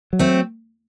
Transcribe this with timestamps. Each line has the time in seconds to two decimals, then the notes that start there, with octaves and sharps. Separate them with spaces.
0.13 F#3
0.19 A3 C4